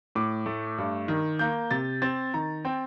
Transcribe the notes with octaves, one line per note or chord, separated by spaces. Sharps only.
A2 D6
A3
G2
D#3
A#3 G6
C3 A6
C4 A6
D#3 A#5
C4 G5